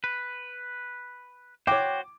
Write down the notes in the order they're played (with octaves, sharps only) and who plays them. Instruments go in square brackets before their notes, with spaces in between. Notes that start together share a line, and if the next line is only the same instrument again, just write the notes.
[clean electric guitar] B4
[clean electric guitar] F#4 C5 [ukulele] C#5 G5 [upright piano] D6